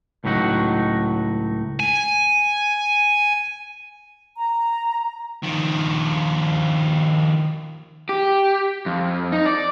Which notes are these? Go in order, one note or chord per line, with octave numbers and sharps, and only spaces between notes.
C#2 A2 F#3 D#4 F#4
G#5
A#5
D#3 F3
G4
F2
D#4
D5